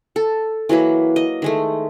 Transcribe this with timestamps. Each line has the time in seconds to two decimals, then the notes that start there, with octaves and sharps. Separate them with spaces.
0.16 A4
0.69 E3 F#3 A#3 B4
1.16 D#5
1.42 D#3 G#3 A3